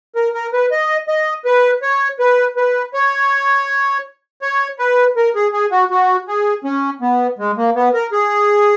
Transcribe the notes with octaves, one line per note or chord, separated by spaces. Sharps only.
A#4
A#4
B4
D#5
D#5
B4
C#5
B4
B4
C#5
C#5
B4
A#4
G#4
G#4
F#4
F#4
G#4
C#4
B3
G#3
A#3
B3
A#4
G#4